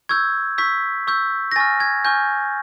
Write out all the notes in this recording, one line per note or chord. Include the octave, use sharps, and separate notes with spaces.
C#6 E6 G6 G#6
C#6 E6 G6 B6
C#6 E6 G6
A#6
G#5 C#6 F6 A6
G#6
G#5 C#6 F6 G6